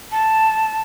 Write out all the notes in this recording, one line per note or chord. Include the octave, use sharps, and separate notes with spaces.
A5